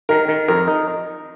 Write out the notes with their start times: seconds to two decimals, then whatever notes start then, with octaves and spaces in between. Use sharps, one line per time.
0.09 D#3 A#4
0.29 D#3
0.48 F2 A#4
0.68 D#4